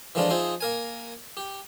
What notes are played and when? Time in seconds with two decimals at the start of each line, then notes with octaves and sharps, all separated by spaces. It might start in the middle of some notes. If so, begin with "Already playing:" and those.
0.15 E3 F3 G#3 A3 D4 F4
0.30 F3 D#4 G#4 C5 E5
0.61 A#3 A#4 G#5
1.37 G4